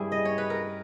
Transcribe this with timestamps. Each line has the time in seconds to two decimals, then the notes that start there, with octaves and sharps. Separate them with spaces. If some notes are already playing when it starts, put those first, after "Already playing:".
Already playing: G2 G3 C#4 E4 G#4
0.12 D#5
0.25 C#5
0.38 B4
0.50 A#4